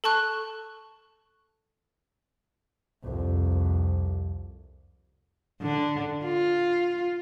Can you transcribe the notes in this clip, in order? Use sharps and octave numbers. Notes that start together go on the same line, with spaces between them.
A4 A5 C#6 F#6
C2 F2
D3
F4